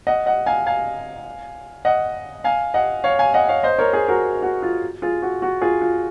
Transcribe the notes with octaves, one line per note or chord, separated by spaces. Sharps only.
D#5 F#5
D#5 F#5
F5 G#5
F5 G#5
D#5 F#5
F5 G#5
D#5 F#5
C#5 F5
F5 G#5
D#5 F#5
C#5 F5
C5 D#5
A#4 C#5
G#4 C5
F#4 A#4
F#4
F4
F4 G#4
F#4
F#4
F4 G#4
F4